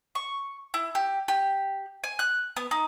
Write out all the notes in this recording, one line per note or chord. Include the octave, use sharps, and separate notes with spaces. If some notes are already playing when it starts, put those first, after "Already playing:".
C#6
E4
G4
G4
G#5
F#6
B3
D#4